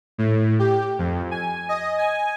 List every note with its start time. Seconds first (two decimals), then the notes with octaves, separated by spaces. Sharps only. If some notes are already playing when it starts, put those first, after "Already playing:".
0.18 A2
0.59 G4
0.99 F2
1.31 G#5
1.69 D#5
1.98 G#5